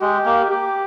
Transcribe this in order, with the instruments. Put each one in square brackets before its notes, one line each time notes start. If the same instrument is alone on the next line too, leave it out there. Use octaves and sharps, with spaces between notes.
[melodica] G#3 [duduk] G4
[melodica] A#3
[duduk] G4